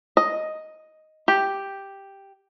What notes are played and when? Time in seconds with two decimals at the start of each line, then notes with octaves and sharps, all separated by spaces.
0.17 D#5
1.28 G4